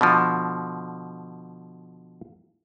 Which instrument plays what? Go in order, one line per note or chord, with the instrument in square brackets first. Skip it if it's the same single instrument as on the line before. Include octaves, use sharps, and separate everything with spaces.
[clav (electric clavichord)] B2 D3 F3